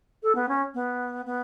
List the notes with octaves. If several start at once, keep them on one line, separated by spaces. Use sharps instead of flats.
A4
B3
C#4
B3
B3